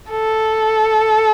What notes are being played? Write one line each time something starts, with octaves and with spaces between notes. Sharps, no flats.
A4